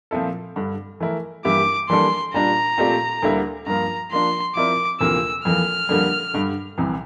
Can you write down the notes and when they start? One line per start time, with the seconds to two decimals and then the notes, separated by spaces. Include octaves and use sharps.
0.11 A#2 F3 C4 E4 A4
0.56 G2 D3 G3
1.00 E3 A3 E4 A#4
1.45 G2 E3 A#3 E4 G4 D6
1.89 E3 G3 A#3 D4 A4 C6
2.34 A#2 G3 D4 A#5
2.78 A#2 A3 C4 G4 D5
3.23 D2 D3 G3 A#3 E4
3.66 G2 F3 A#3 F4 A#5
4.12 F3 A#3 D4 C6
4.55 F3 C4 E4 A#4 D5 D6
5.00 D2 C3 E3 A#3 F4 E6
5.45 F2 E3 A#3 F6
5.89 F2 D3 G3 A#3
6.34 G2 D3 G3
6.78 C2 C3 E3